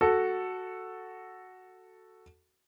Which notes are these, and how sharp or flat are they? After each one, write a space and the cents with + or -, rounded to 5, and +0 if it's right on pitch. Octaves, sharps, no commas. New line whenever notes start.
F#4 +0 A4 +0